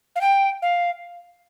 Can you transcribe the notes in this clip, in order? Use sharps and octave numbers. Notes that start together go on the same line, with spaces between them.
F5
G5
F5